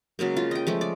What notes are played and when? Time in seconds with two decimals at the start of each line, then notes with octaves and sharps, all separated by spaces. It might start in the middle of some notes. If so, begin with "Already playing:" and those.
0.19 C#3 F#3 G#3 A#3
0.37 F4
0.51 D#5 G5
0.67 F3 G#3 A3
0.81 D5